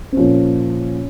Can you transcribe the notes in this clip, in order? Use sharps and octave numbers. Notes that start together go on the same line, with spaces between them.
C4
A#2 F3 C#4